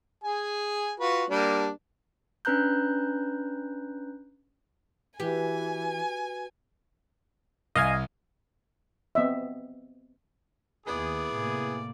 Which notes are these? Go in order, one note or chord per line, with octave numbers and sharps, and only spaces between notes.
G#4 G#5
F4 F#4 B4
G3 A#3 D4
C#4 D4 B4 A#5 F#6 G6
E3 F#4 G4 B4 G#5
C2 D#5 F5 G#5
B3 C4 D#5 E5
D#2 B3 E4 G#4 D5
A2 C3 A#3